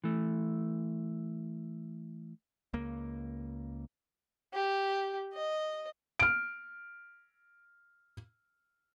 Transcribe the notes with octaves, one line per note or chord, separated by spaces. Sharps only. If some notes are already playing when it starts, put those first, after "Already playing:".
E3 A3
C#2 A#3
G4
D#5
F6 D7